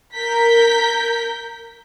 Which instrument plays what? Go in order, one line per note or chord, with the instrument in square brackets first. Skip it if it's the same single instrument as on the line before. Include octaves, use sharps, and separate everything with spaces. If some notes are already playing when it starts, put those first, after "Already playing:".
[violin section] A#4 G6 B6